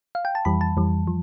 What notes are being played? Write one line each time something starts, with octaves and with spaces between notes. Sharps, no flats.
F5
G5
A5
F2 E3 G3 B5
A5
F2 E3 G3
F3